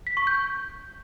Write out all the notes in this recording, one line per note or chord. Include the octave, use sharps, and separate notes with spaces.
B6
C#6
G6